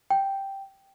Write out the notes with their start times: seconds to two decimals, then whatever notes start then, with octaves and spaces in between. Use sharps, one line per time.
0.10 G5